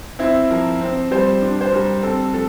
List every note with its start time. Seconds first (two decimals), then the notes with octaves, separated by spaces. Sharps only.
0.19 C4 E4
0.50 F3 A#4
0.81 C4
1.11 G3 C5
1.42 D4
1.61 C5
1.72 G3 A#4
2.03 C4 A4
2.34 F3 A4